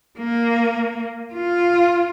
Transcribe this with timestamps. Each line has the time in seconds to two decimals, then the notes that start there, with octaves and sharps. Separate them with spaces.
0.19 A#3
1.34 F4